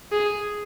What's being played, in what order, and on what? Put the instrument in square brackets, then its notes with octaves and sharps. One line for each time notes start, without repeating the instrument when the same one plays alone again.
[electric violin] G#4